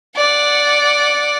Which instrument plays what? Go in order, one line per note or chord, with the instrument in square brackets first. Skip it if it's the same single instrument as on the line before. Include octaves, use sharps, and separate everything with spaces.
[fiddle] D5 F#5